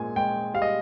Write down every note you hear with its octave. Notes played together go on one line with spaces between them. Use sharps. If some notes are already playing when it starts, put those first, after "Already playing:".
Already playing: A#2 G#3 G#5
G#3 G5
G3 F5
D#5